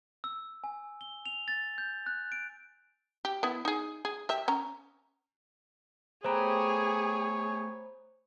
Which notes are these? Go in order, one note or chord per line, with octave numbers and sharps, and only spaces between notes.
E6
G#5
G7
F7
A6
G6
F#6
D7
G4
B3 E4
D#4 G#4
G#4
G4 E5
C#4 A#5
A3 B3 G4 G#4 C5 C#5 A#5 B5